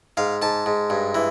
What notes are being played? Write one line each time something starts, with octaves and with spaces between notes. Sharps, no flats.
G#2 F5
G#2 A5
G#2
G2
E3